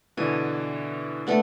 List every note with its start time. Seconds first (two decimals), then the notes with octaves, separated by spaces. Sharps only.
0.17 B2 D3 E3 G#5
1.27 A3 B3 D4